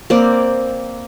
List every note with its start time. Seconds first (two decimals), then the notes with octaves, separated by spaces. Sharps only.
0.10 A#3 C4 D5